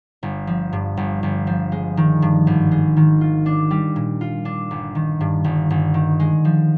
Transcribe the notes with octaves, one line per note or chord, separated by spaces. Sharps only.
G1
F3
G2
G1
G1
F3
G#3
D#3
G2
G#1
G#3
D#3
F4
D4
G3
A#2
F4
D4
G1
D#3
G2
G1
G1
D#3
G#3
F3